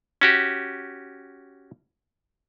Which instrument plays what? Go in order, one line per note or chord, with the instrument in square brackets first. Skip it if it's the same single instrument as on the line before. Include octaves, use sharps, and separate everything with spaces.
[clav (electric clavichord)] C#4 F#4 G4